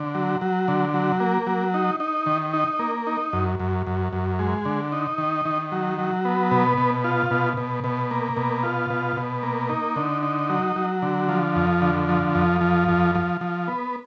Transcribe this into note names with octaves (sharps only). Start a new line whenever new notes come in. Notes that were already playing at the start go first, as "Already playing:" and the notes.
Already playing: D3
F#3
F#3
D3
F#3
A#3
F#3
D#4
D#4
D#3
D#4
A#3
D#4
F#2
F#2
F#2
F#2
G#3
D3
D#4
D#3
D#3
F#3
F#3
B3
B2
B2
F4
B2
B2
B2
A#3
B2
F4
B2
B2
A#3
D#4
D3
D#4
F#3
F#3
D3
F3
F2
D3
F3
F2
F3
F2
F3
F3
B3